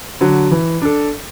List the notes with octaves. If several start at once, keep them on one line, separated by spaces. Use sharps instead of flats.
D3 F#3
E3
D4 A4